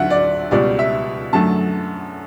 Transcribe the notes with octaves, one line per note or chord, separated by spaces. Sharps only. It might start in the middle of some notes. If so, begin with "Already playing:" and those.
Already playing: D2 D3 F#3 E5 F#5
D5
C#2 B2 G3 D5
E5
F#2 D3 F#3 A3 A5